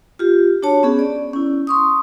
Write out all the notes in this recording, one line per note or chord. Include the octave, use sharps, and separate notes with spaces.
F4 G4
D4 F#4 C#5 A5
B3 C#4 G#4
D5
C#4 E4
C6 C#6 D#6